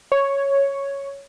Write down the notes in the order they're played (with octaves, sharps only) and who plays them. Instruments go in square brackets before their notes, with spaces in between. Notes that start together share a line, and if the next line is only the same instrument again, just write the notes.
[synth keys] C#5